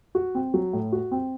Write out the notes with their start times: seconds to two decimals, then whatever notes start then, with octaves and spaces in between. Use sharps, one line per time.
0.15 F#4
0.35 C4
0.54 F#3
0.73 A2
0.92 F#4
1.11 C4